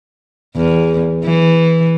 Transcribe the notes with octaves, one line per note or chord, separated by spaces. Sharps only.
E2
E3